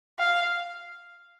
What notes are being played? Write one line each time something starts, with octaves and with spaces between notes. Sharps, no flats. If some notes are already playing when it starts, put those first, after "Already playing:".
F5